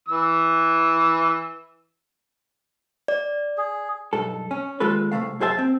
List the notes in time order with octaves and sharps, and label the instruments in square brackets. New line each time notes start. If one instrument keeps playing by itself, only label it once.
[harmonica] E3 E6
[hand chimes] D5
[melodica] G#4
[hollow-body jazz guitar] B1 G2 A4
C#4
D#2 G#3 F4 A4 B4
C2 F2 C3 A3 F5
F#2 G#4 C5 E5 A5
C4